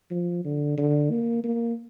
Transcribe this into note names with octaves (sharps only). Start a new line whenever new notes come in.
F3
D3
D3
A#3
A#3